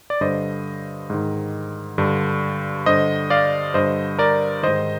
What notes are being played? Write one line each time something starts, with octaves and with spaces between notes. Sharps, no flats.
D5
G2 D3 C5 D#5
G#2 D#3
G2 D3
G2 D3 C5 D#5
D5 F5
G2 D3 C5 D#5
A#4 D5
G#2 D#3 C5 D#5